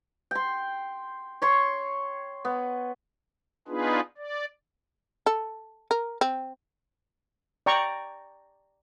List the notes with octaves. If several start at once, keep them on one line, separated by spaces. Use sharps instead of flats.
G5 C6
C#5 C6 C#6
B3
B3 D4 D#4 F4 G#4 B4
D5
A4
A#4
C4
D5 G5 A#5 C#6